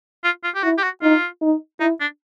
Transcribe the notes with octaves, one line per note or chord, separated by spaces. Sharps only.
F4
F4
G4
E4 F#4
G4
F#4
D#4 F4
D#4
D#4 E4
D4